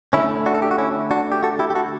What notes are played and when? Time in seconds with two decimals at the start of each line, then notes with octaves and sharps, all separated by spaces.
0.13 D3 A3 C#4 E4
0.46 D4 F#4
0.54 A4
0.62 G4
0.71 F#4
0.78 C#4 E4
1.11 D4 F#4
1.32 G4
1.43 F#4 A4
1.59 E4 G4
1.70 G4
1.75 F#4 A4